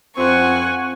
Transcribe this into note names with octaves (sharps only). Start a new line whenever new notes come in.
F2 C4 F#5 G#5 C#6